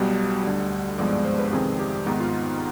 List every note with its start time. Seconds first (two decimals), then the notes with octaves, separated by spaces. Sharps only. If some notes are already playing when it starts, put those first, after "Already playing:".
Already playing: B1 B2 G3
0.44 D2 D3 G3
0.98 G#1 G2 F3 G#3 B3 D5
1.12 D5
1.25 C5
1.39 B4
1.53 F2 C3 D#3 G#3 C4 G#4
1.79 G4
2.06 G#2 D#3 B3 D#4
2.20 F4